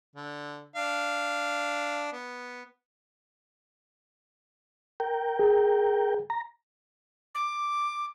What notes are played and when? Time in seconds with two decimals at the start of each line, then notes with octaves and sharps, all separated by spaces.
0.16 D3
0.76 D4 F5
2.13 B3
5.00 A#4 G5
5.39 G#4
6.30 A#5
7.35 D6